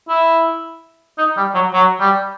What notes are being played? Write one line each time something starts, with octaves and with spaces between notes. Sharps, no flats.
E4
D#4
G3
F#3
F#3
G3